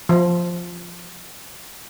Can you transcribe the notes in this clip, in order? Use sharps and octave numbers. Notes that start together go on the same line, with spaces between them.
F3